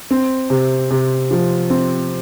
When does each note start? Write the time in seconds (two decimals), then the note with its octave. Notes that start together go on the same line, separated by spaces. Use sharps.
0.11 C4
0.50 C3
0.91 C3
1.31 F3
1.70 C4